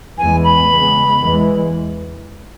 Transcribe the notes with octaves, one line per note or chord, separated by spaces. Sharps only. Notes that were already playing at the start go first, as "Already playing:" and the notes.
E2 E3 G#3 B3 G#5
B5
C#3 G#3 B3
E2 E3 G#3